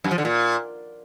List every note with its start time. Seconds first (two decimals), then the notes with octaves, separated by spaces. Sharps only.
0.04 F#2
0.11 F3
0.18 D3
0.25 A#2